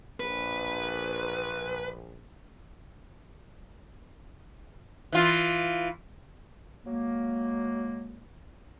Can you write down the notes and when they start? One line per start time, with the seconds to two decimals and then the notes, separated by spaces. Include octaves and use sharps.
0.20 A#1 B4
5.12 E3 F4
6.86 F#3 G#3 A#3